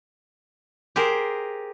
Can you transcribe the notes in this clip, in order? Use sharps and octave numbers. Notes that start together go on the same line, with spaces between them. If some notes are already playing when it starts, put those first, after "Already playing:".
G4 G#4 A#4 C5